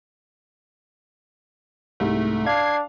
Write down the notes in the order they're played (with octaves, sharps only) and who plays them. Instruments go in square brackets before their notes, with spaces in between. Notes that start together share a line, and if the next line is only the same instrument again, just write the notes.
[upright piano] C2 G#2 [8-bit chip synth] A3
[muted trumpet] D4 [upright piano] F5 [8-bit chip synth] G#6 C7